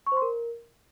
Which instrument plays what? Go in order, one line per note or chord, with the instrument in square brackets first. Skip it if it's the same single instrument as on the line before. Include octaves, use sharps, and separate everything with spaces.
[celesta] C#6
C5
C6
A#4